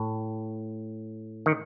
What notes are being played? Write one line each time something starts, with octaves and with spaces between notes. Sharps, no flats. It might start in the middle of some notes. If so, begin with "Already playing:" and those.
Already playing: A2
D#3